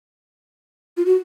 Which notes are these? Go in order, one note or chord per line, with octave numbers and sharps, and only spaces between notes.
F4
F#4